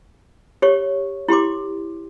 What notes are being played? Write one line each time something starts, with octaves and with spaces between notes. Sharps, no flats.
G4 C#5 C#6
E4 G4 C6 D6